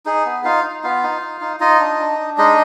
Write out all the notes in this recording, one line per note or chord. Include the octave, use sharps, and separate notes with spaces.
D#4 G#4
B3
D#4 F4 F5
D#4
B3 F4 F5
D#4
D#4
D#4
D#4 F4 D#5
D4
D4
D4
G#3 D#4 D#5